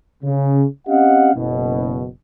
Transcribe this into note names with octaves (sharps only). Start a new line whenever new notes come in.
C#3
C4 C#4 G4 D#5 F5 F#5
F#1 B2